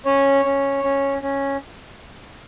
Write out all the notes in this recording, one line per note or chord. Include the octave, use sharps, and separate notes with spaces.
C#4 C#5
C#4
C#4
C#4